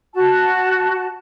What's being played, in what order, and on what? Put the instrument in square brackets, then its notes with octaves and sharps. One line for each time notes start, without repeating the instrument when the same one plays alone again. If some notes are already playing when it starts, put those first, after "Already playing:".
[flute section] F#4 A5